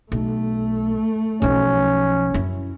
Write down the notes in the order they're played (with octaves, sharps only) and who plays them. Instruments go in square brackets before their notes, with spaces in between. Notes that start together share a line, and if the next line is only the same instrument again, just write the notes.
[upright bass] B1 [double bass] A3
[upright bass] B1 F3 [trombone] C#4
[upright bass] F#2 E4